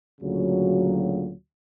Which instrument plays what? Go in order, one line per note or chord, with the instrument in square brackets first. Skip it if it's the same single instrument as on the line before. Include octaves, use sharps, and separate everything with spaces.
[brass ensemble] D2 A#2 C#3 F#3